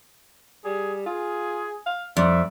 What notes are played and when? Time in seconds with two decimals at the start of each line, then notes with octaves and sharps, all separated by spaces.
0.65 G3 G#4
1.06 F4 G#4
1.86 F5
2.17 F2 D5 E5